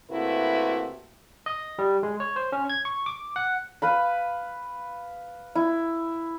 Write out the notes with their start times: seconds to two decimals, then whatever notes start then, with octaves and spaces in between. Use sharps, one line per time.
0.10 C3 A3 A#3 E4 F#4 B4
1.46 D#5
1.79 G3
2.03 G#3
2.20 C#5
2.36 C5
2.52 C#4
2.70 G#6
2.85 C#6
3.06 D6
3.36 F#5
3.82 B4 F5 B5
5.55 E4